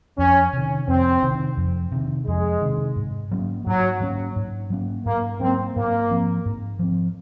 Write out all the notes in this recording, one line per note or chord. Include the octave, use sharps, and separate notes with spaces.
F2 C#4
C3 D#3
F2 C4
C3 D#3
F2
C3 D#3
F2 G#3
C3 D#3
G#2
F#3 A#3 C#4
G#2 F#3
F#3 A#3 C#4
G#2
F#3 A#3 C#4
G#2 A#3
F#3 A#3 C4 C#4
G#2 A#3
F3 C4
G#2
F3 C4